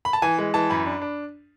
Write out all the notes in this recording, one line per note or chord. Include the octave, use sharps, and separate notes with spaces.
B5
A5
E3 G#5
G#3
E3 A5
F#2 B5
D4
D4